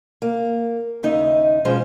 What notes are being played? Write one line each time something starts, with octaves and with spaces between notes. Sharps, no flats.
A#3
D#2 C#3 D#4 D#5 E5
B2 F3 G#3 C#4 C5